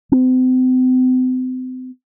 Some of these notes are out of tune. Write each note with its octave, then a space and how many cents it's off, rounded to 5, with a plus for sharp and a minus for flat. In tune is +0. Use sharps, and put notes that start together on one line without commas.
C4 -40